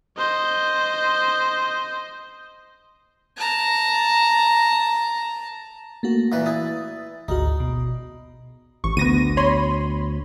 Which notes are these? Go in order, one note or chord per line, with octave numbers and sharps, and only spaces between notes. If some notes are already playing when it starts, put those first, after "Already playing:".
C5 D#5
A5 A#5
A3 A#3 F#4
A#2 E3 B4
E4 D#6 A6
G#1 D2 D#4 F#4
B2
A1 C#6
D2 B3 A#6 D#7
C#5 B5 C6